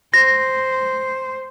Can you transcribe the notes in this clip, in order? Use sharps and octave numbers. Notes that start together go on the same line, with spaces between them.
C5 A#6